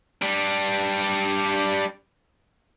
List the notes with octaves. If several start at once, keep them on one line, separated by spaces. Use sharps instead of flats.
G3 D4